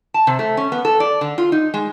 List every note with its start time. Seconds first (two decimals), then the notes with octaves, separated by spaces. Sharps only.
0.14 A5
0.27 C3
0.39 A3
0.57 C#4
0.72 B3
0.85 A4
1.00 D5
1.21 D3
1.38 F4
1.52 D#4
1.74 G#3